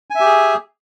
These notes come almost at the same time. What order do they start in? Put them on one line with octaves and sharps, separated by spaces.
G#5 E5 G4 G#4